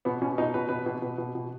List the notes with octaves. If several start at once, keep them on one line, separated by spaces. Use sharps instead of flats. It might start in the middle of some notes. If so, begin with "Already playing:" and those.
B2 B3
B2 C#4
B2 D#4
B2 B4
B2 B4
B2
B2
B2
B2